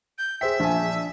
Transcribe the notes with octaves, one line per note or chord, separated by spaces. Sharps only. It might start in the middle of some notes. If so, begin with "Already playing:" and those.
G6
G#4 C5 E5 G5 B6
A#1 D4 G#5 A5